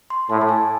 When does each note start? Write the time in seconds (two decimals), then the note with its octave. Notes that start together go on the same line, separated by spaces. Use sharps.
0.10 C6
0.30 A2 A5
0.41 A5
0.49 G#5